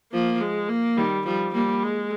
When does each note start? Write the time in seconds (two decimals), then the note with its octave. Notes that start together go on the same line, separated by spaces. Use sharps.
0.12 F3 A#3
0.41 G#3
0.69 A#3
0.97 D#3 G3
1.26 F3 G3
1.54 G3 A#3
1.83 G#3